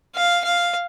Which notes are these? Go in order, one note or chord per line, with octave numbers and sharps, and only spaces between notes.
F5
F5